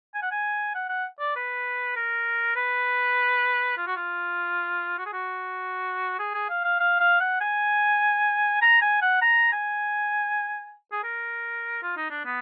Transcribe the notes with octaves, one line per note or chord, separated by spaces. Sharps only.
G#5
F#5
G#5
F#5
F#5
D5
B4
A#4
B4
F4
F#4
F4
F#4
G#4
F#4
G#4
G#4
F5
F5
F5
F5
F#5
G#5
A#5
G#5
F#5
A#5
G#5
G#4
A#4
F4
D#4
D4
B3